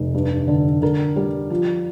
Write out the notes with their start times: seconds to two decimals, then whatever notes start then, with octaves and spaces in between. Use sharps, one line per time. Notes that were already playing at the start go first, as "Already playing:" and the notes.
Already playing: F1
0.14 G2
0.48 D3
0.82 D3 A#4
1.16 G3
1.50 F3